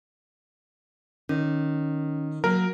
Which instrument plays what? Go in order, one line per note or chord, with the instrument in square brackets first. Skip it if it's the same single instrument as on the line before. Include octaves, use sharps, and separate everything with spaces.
[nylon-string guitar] D#3 [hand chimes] C#4
[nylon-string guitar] F#3 A#3 [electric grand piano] A#4